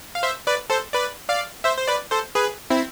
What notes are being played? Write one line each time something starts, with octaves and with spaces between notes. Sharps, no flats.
F5
C5 E5
B4 D5
A4 C5
B4 D5
D5 F5
C5 E5
C5
B4 D5
A4 C5
G#4 B4
C4 E4